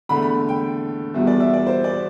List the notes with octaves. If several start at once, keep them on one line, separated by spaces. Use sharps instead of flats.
E2 D3 A3 B5
B5
G5
E2 B2 G3 E5
D5
E5
D5
C5
D5